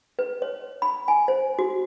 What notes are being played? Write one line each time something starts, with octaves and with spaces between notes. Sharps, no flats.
B4
C#5
B5
G#5
C5
F#4